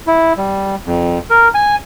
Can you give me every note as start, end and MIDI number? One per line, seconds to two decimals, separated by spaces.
0.07 0.33 64
0.37 0.75 55
0.85 1.18 41
1.30 1.48 70
1.54 1.75 80